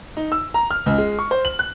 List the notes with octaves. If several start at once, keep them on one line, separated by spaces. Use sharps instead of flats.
D#4
E6
A#5
F6
C#2
G#3
C#6
C5
F#7
F#6